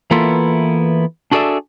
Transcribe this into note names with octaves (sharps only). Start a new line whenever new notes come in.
E3 A#3 B3 E4 F4 A4
D4 F#4 G#4 A4 D5 E5